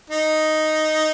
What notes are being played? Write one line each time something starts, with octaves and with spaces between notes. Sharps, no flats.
D#4